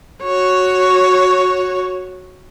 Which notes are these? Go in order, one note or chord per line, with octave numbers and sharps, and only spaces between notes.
F#4 C#5